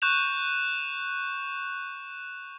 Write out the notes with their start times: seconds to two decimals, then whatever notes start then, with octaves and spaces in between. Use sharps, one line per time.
0.02 C#6 F#6 G6 E7 F7